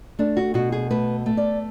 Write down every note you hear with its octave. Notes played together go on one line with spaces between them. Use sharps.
A3 D4
F#4
B2 F#4
G#4
A3 B4
A3
D5